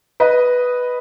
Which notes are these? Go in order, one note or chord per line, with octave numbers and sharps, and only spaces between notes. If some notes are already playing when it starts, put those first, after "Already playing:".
B4 D#5